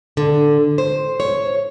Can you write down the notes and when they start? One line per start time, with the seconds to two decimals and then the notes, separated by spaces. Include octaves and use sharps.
0.17 D3
0.78 C5
1.20 C#5